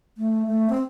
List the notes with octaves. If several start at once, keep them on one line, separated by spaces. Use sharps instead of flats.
A3
A3
C4